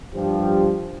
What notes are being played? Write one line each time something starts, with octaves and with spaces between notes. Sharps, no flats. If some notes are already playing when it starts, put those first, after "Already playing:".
G2 F3 G4